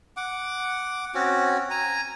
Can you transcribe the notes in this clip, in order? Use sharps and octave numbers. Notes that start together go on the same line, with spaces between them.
F#5 D6
C4 C#4 F#4
G#5 A#5